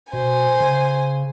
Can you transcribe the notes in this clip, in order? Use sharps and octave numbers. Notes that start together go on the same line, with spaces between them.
B2 C5 G#5
C#3